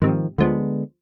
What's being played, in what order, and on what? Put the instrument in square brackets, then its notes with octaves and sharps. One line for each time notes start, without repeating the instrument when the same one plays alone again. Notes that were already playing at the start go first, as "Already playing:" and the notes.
[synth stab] G#2 C3 [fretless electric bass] D#3 F3
[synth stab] D2 F3 [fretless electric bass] D3 G#3 B3